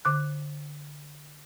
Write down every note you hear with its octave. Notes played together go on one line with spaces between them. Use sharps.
D3 D6 F#6